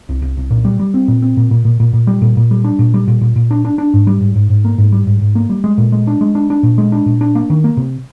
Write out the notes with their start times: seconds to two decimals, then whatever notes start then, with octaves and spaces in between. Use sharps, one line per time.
0.09 C2
0.22 C2
0.37 C2
0.51 A#2
0.65 G3
0.80 G3
0.94 C4
1.08 A#2
1.22 C4
1.37 A#2
1.51 A#2
1.65 A#2
1.80 A#2
1.93 A#2
2.07 G3
2.22 A#2
2.37 A#2
2.51 G3
2.64 D4
2.79 A#2
2.94 G3
3.08 A#2
3.21 A#2
3.36 A#2
3.51 D4
3.65 D4
3.78 D4
3.94 G#2
4.07 G3
4.21 G#2
4.35 G#2
4.50 G#2
4.65 A#3
4.78 G#2
4.92 G3
5.07 G#2
5.21 G#2
5.35 A#3
5.49 G3
5.64 G#3
5.78 A#2
5.92 G#3
6.07 D4
6.21 G#3
6.35 D4
6.50 D4
6.63 A#2
6.78 G#3
6.92 D4
7.06 A#2
7.21 D4
7.35 A#3
7.50 D#3
7.64 A#3
7.77 C3